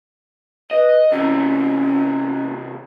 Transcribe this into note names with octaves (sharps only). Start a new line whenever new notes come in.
B4 D#5
C3 E3 C#4